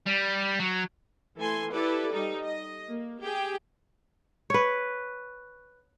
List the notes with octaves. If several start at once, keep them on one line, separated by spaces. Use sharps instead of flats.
G3
F#3
E3 A3 A4 G#5 C6
E4 G4 A4 B4 D5
G3 D#4 A4
D#5
A#3
G4 G#4 G5
B4 C#5